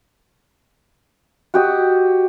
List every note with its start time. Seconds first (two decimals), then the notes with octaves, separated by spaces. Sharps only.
1.54 F#4 G4 D#5